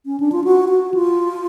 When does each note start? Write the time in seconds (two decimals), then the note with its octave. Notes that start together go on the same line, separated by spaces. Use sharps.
0.06 C#4
0.20 D4
0.32 F4
0.44 F#4
0.69 F#4
0.94 F4